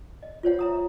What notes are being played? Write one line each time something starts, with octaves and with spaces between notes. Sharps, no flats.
D#5
F4 C5 C#5 F#5
E5 A#5 D#6